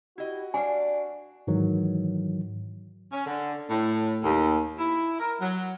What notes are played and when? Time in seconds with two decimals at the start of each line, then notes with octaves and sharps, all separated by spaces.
0.18 E4 F#4 G4 D#5
0.54 D4 D5 F5 G#5
1.47 G#2 D#3 E3 F#3
3.13 C#4
3.26 D3
3.70 A2
4.24 D#2
4.79 E4
5.20 A#4
5.41 F#3